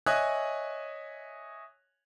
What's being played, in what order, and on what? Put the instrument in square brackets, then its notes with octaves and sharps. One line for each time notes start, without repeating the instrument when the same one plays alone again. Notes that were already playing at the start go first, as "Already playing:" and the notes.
[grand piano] C#5 D#5 E5 G#5 D#6 F#6